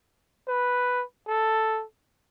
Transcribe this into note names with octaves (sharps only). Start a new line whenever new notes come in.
B4
A4